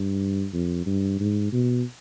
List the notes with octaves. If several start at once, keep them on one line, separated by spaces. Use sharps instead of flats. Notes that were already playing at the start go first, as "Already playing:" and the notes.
Already playing: G2
F2
G2
G#2
B2